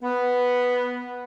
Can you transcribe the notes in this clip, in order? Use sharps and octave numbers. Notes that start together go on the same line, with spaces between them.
B3